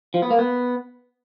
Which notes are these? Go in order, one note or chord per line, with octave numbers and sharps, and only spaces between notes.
F3
B3
A#3
B3